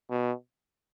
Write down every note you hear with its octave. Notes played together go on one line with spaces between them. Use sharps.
B2